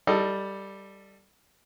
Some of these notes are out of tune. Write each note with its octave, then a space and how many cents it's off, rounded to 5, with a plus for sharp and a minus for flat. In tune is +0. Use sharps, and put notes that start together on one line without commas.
G3 +0 A4 +20 D#5 +0